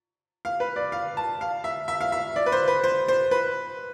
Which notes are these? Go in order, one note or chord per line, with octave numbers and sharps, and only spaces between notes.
F5
B4
D5
F5
A5
F5
E5
E5
F5
E5
D5
B4
C5
B4
C5
C5
B4